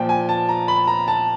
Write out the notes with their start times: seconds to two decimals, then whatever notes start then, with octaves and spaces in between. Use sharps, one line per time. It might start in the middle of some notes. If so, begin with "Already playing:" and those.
Already playing: A#2 F3 G5
0.09 G#5
0.29 A5
0.49 A#5
0.68 B5
0.87 A#5
1.08 A5